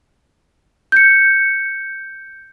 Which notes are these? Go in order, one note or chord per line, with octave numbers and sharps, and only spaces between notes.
G6 C#7